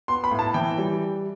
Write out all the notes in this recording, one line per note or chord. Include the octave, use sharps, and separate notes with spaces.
B3 C6
B5
A2
A5
E3 G5
G3